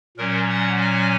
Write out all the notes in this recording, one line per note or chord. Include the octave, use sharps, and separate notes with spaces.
A#2 F#3 C#4 A#4
F#5
G#5